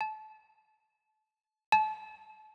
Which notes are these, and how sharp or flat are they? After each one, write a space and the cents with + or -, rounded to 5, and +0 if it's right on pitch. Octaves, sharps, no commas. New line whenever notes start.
A5 -25
A5 -30